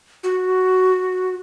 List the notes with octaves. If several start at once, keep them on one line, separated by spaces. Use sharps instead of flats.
F#4